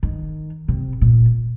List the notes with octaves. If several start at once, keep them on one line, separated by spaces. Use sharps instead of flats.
D#3
C3
A#2